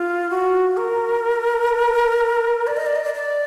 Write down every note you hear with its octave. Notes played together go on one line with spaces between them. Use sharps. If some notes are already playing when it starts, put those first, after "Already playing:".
Already playing: F4
F#4
A#4
D5
D#5
D5
D#5
D5
D5